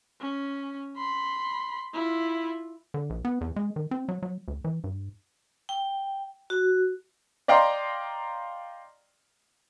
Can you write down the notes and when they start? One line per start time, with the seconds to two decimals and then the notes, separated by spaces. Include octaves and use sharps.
0.21 C#4
0.97 B5 C6
1.94 E4 F4
2.94 D3
3.10 A#1
3.25 B3
3.41 E2
3.56 G#3
3.76 D#3
3.91 C4
4.09 F#3
4.23 F#3
4.48 D2
4.65 E3
4.84 G2
5.69 G5
6.50 F#4
7.48 D5 D#5 F5 G5 A#5 C6